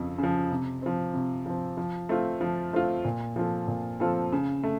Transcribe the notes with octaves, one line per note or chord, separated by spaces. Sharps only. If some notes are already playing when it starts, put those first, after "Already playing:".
Already playing: F2 C#3 F3
C#3
F3
C3
F3 C4
C3
F3 C4
F3
A3 C4 F4
F3
A3 C4 F4
A#2
F3 C4 F4 A4
A#2
F3 C4 F4 A4
C#3
A3